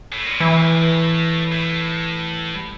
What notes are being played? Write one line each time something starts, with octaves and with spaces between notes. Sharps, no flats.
A2
A#2
A2 E3
A2
G3